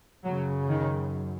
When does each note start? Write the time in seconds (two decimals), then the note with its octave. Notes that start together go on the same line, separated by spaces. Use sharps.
0.25 F#2 C#3 F#3
0.69 D#3